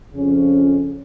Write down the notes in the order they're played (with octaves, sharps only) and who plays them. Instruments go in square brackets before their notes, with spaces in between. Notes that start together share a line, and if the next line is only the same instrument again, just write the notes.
[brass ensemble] F2 C#3 F3 C#4